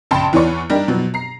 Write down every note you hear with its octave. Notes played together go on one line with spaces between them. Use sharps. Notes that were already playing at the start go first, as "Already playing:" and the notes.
A#1 C#3 G5 A5 B5 C6
E2 E3 B4 C#5 D5 C#6
G3 D4 D#4 G4 A#4
B2 F3 F#3
A#5 C7